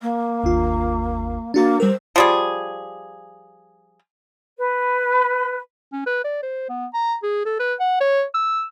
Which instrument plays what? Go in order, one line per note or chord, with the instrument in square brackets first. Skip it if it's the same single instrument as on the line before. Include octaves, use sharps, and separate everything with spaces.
[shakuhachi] A#3
[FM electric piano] G1 D#2 F4
[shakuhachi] A#3 [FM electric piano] D4 F#4 A6
[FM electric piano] G3 A#4 [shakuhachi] C5
[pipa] F3 G3 G#4
[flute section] B4
[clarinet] C#4
B4
D5
C5
B3
A#5
G#4
A4
B4
F#5
C#5
E6